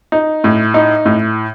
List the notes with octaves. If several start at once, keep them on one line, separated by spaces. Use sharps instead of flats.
D#4
A2
D#4
A2